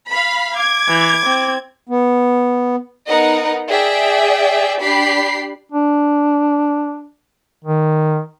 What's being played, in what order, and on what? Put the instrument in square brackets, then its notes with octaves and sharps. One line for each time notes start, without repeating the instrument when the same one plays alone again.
[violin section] F5 B5
[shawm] D6 [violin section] G#6
[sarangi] E3
C4
[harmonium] B3
[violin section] B3 D#4 A#4 D#5 F#5
G#4 D5 E5 G5
D4 G4 B5 C7
[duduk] D4
D#3